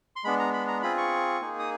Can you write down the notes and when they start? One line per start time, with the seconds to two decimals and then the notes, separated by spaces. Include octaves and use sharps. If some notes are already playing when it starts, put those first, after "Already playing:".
0.16 C6
0.24 G#3 B3 D4 B5
0.39 A#5
0.54 B5
0.68 A#5
0.82 C4 F4 G#4 B5
0.98 C#6
1.41 A#3 D#4 G#4
1.59 D#6